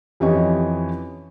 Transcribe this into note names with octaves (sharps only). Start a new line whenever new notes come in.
F2 E3 C#4 G4 D#5 C#6